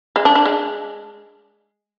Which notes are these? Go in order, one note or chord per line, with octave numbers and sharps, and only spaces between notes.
G#3
D4
D4
G#3